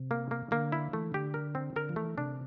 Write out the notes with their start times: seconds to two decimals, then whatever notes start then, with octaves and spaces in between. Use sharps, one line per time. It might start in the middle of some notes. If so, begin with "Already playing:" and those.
Already playing: C3
0.11 A#3
0.31 A#3
0.51 D3 A#3
0.72 E4
0.93 E3 A3
1.14 D3 G4
1.34 A#4
1.55 C4
1.76 D3 A#4
1.89 F3
1.96 E3 A3
2.18 C3 D4